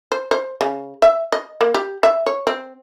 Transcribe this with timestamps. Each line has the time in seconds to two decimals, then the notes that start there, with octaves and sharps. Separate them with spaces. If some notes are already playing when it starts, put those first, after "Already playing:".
0.12 C5
0.31 C5
0.61 C#3
1.02 E5
1.32 D#5
1.61 A#3
1.74 G4
2.03 E5
2.26 C#5
2.47 C4